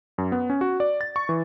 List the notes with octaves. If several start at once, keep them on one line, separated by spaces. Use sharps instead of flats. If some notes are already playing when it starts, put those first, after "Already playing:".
F#2
B3
C#4
F#4
D5
A6
C#6
E3